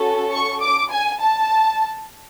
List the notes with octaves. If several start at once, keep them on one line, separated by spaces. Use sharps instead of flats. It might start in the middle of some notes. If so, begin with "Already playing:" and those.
Already playing: C#4 F#4 A4
C#6
D6
G#5
A5